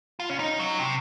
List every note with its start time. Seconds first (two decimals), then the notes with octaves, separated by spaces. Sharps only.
0.20 F4
0.29 C#4
0.39 D#4
0.59 F#3
0.79 C3